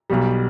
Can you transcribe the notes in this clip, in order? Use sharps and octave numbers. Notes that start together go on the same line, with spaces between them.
B1 B2 G3